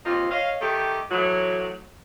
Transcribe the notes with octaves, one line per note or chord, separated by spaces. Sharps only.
D#2 C4 D#4 F4
C#5 D#5 F5
D#3 A3 G4
A2 E3 F#3